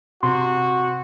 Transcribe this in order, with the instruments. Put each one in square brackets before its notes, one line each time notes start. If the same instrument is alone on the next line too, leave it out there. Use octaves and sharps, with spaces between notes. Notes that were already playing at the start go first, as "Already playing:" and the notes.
[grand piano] C3 [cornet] F#4 [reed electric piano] C6